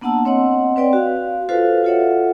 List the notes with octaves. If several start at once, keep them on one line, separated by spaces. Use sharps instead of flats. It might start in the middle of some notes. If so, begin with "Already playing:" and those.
A#3 B3 D4 F#5 A5 E6
C4 C#5 D#5 F#5
C4 B4 D5 G5
F#4 F5
F4 F#4 A4 B4 C5 F5
F4 A4 C#5 E5 F#5